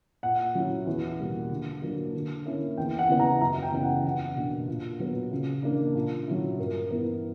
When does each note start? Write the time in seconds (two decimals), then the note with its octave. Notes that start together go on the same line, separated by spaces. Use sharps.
0.23 A#2 F#5
0.55 F#3 C#4 E4
0.87 E2
1.19 B2 G3 A#3
1.50 D3
1.82 F#3 A#3 D4
2.14 D3
2.45 A#3 C#4 E4
2.77 E2 G5
2.99 F#5
3.09 C#3 E3 B3
3.19 A#5
3.41 F#2 A#5
3.62 G5
3.72 C#3 E3 B3
3.83 F#5
4.04 E2 F#5
4.36 B2 A#3 D4
4.68 A#2
5.00 F#3 B3
5.32 C#3
5.63 E3 A#3 D4
5.95 A#2
6.27 F#3 C#4 E4
6.59 G2 A#4
6.90 E3 B3 E4